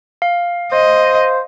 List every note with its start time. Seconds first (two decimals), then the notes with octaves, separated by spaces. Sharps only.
0.22 F5
0.72 C5 D#5